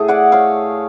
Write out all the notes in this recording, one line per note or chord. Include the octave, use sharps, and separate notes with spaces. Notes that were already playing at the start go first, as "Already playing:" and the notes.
Already playing: A2 A3 G#4
D5 F#5
C#5 F5